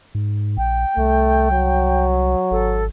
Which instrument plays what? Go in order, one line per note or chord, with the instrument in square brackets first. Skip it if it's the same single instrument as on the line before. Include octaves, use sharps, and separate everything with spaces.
[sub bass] G#2
[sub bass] A#1 [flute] G5
[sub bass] C2 [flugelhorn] A3
[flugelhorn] F#3
[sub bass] G#1 [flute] A4